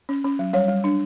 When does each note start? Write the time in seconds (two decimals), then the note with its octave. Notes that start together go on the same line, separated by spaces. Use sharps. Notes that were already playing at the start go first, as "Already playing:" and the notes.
0.09 C#4
0.24 C#4
0.39 F#3
0.53 G3 C#5
0.68 G3
0.84 D4